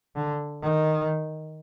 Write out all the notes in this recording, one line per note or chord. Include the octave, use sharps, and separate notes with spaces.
D3
D#3